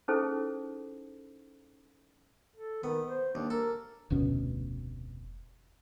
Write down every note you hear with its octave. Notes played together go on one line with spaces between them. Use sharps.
C#4 D#4 E4 G#4 A4 C5
A4
D#3 B3
C5
D#2 D4
A4 A#4
F1 D2 B2 C#4